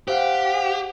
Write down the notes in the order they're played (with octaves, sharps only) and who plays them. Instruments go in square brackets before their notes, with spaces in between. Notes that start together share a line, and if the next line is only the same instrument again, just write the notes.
[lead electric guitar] G4 [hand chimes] C5 F5 F#5